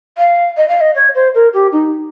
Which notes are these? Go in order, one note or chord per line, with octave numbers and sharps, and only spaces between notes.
F5
D#5
F5
D#5
C#5
C5
A#4
G4
D#4